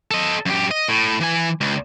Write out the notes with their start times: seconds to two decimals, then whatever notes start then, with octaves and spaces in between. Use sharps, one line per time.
0.11 A4 D#5
0.46 F#2 G4
0.71 D#5
0.88 A2
1.21 E3 G#5
1.61 C#2